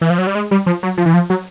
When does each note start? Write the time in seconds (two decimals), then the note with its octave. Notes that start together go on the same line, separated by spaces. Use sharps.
0.01 E3
0.10 F3
0.18 F#3
0.27 G3
0.35 G#3
0.51 G3
0.66 F3
0.83 F#3
0.97 F3
1.06 E3
1.14 F3
1.30 F#3